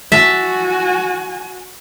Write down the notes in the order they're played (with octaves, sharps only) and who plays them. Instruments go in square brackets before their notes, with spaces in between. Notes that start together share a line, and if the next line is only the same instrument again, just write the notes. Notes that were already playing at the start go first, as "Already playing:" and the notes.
[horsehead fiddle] F#4 G#5 [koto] E5 A5